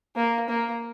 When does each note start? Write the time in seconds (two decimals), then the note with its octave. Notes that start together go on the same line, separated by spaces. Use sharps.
0.16 A#3
0.48 A#3